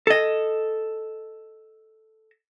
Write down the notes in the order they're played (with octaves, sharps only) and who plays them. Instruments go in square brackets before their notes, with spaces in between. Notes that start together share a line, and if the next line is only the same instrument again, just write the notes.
[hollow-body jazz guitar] A4 D#5